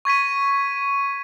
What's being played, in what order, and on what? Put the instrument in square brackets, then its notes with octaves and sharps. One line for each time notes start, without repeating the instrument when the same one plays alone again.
[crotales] C#6 G#6 B6 D#7